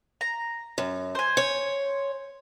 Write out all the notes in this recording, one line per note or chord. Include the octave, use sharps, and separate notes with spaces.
A#5
F#2
C5 G#5
C#5